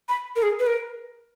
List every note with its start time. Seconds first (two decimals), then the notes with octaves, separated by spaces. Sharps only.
0.09 B5
0.36 A#4
0.42 G#4
0.59 B4
0.67 A#4